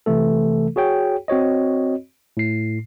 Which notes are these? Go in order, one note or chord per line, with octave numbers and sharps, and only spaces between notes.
C3 E3 A3 A4
F#4 G#4 C#5 G5
C4 F#4 C#5 D#5
A2 C7